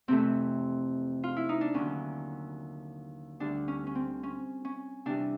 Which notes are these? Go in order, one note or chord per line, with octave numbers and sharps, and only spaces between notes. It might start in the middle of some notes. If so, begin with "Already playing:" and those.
F2 C3 E3 A3 C4
F4
E4
D#4
D4
D#2 D3 F#3 C#4
D2 D3 G3 D4
C#4
C#4
C4
C#4
C#4
C3 E3 G3 D4